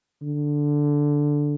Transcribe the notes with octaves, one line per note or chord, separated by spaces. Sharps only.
D3